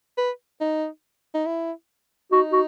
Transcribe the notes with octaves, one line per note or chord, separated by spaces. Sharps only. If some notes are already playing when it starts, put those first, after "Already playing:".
B4
D#4
D#4
E4
D#4 F#4
F#4